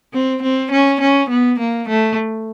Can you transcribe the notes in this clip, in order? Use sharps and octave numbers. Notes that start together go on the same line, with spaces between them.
C4
C4
C#4
C#4
B3
A#3
A3